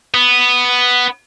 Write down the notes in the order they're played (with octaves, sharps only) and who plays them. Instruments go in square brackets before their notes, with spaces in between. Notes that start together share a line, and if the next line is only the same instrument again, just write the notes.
[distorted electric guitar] B3